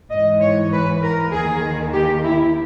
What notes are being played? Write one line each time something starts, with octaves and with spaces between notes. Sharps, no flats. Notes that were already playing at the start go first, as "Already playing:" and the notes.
G#2 E3 D#5
C#5
B4
A#4
D#2 D#3 G#4
G4
E4